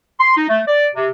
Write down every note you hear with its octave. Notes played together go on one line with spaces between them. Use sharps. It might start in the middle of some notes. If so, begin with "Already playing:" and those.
C6
D#4
A3
D5
C3